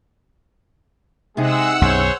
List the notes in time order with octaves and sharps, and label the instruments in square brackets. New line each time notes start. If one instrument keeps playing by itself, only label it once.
[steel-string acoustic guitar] C3 D#4 [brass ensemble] G#3 G#4 [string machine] F#5 E6
[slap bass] B1 F#2 [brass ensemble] G#4 C5 C#5